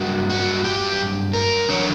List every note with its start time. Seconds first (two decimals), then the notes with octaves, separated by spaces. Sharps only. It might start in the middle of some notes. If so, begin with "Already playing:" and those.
Already playing: G2 F#3 A#3 F#4
0.30 F#4
0.64 G4
1.33 A#4
1.69 E2 D3 F#3 C#5